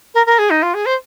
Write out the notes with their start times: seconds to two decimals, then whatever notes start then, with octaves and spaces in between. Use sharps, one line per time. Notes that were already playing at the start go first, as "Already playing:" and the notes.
0.14 A#4
0.26 A#4
0.38 G#4
0.50 D#4
0.62 F4
0.74 G#4
0.85 C5